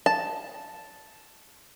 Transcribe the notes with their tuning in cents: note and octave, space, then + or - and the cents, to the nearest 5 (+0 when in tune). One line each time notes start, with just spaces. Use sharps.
A5 +0